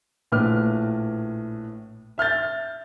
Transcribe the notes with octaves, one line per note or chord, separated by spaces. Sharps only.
A#1 A2 B4 D6 F6
E5 F6 G6 A6